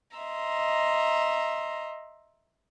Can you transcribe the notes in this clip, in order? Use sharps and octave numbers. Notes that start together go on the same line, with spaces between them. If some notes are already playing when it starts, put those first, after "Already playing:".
D#5 E5 A#5 C6